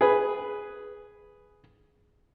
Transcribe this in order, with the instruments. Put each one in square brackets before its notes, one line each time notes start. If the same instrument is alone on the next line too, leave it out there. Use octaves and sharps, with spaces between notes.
[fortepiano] G#4 B4